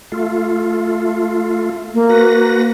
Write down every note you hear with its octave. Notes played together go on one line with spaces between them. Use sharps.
A3 F4
A#3
F#4 B4 A#6